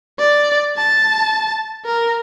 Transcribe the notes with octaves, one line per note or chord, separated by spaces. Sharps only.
D5
A5
A#4